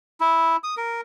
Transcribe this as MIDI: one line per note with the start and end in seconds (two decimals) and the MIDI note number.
0.20 0.57 64
0.64 0.75 87
0.77 1.01 70